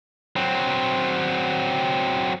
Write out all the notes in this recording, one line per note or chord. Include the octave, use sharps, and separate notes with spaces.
F#3 C4